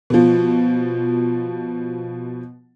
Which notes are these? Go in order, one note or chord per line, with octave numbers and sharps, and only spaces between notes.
B2 F3